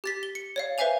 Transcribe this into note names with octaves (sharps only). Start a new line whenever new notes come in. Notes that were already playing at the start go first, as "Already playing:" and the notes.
G4 A6 B6
G7
C#7
C#5 D5 F5
B4 C5 E5 F5 G#5 F7